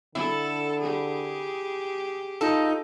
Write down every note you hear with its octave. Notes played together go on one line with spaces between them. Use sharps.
D3 E4 A4
G4 G#4
D#4 F4 A4